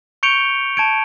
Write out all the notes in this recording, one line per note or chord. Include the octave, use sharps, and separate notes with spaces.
C#6 G6 C#7 D7 F7 G7
A5 G#6 D7